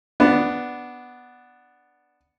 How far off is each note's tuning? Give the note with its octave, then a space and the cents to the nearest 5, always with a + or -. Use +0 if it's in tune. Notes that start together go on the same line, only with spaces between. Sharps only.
B3 +0 D4 +0